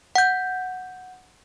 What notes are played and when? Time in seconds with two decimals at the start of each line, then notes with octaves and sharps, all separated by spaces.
0.15 F#5 G6